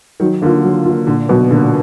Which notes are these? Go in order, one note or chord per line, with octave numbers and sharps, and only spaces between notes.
D#3 F#3
D3 A#3 F4
F#3
A#3 F4
A#2 D3
B2 F#3 B3
A#2 D3